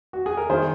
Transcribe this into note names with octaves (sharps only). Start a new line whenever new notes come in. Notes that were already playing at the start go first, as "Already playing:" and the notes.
F#4
G#4
A#4
D#3 G#4 C5